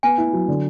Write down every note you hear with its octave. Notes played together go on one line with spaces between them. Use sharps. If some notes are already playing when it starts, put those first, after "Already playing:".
B3 G#5
E4
F#3
D3